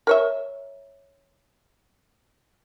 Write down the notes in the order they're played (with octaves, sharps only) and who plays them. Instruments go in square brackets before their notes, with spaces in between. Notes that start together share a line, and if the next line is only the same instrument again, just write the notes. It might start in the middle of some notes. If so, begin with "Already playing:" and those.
[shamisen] A#4 C#5 E5